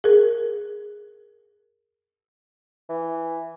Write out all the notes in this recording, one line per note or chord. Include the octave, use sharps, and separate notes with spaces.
G#4 A#4
E3